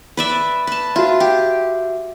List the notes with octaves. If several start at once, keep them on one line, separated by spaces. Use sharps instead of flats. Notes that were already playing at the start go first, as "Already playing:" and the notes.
B4 D5 E5
B4 A5
F4 F#4 E5
G4